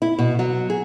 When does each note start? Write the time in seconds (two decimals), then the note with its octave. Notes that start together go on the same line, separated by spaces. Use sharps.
0.02 E4
0.19 B2
0.39 F#3
0.70 G#4